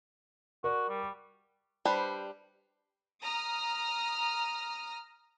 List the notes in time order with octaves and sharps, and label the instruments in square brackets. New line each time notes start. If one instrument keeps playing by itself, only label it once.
[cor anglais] F#4 [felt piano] A#4 D5
[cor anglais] G3
[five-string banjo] G3 D4 B4 C5
[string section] A#5 D#6 F6